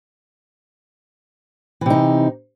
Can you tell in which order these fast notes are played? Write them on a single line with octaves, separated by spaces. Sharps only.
E3 C3 D#4